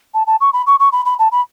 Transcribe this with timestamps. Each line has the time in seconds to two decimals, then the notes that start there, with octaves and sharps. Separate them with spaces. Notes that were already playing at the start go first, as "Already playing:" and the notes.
0.14 A5
0.27 A5
0.40 C#6
0.53 B5
0.66 C#6
0.79 C#6
0.92 B5
1.05 B5
1.19 A5
1.32 B5